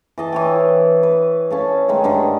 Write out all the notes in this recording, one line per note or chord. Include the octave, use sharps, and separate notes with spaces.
E3 D#5 A5
E3 C#5 G5
B4
C#4 A4 F5
D#3 G#3 A3
G2 D3 D#3